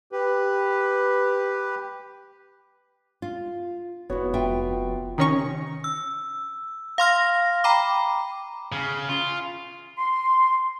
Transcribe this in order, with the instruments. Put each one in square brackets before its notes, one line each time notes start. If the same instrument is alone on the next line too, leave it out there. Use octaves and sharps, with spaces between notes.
[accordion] G4 B4
[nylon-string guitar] F4
[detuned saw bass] F1 [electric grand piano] B3 F#4 [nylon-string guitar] E4 C#5
[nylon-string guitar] F4 E5 G5
[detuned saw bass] C3 [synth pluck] D#3 C#4 C#6 [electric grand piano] D#6 A#6 C#7
[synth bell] E6
F5 C6 F6 A#6
G5 A#5 B5 D6
[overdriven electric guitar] C#3
F4
[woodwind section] C6